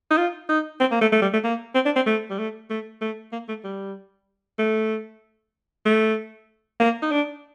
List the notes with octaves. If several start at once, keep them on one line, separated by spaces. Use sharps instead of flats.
D#4
F4
D#4
C4
A#3
A3
A3
G3
A3
A#3
C4
D4
C4
A3
G3
A3
A3
A3
A#3
A3
G3
A3
A3
A#3
D#4
D4